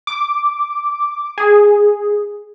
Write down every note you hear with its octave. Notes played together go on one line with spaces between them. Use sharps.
D6
G#4